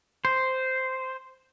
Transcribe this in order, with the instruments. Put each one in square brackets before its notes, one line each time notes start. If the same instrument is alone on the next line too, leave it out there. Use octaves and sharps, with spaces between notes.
[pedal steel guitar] C5